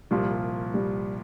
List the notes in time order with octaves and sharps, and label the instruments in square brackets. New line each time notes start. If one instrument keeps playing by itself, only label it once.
[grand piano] C2 A#2 F3 [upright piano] G3
[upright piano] G3